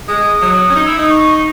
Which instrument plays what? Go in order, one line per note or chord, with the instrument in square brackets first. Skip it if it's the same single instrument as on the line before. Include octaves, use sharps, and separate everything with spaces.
[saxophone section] G#3 [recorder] D#6
[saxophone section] F#3
C#4
D#4
[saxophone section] E4 [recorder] E6
[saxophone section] D#4 [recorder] D#6
[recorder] C#6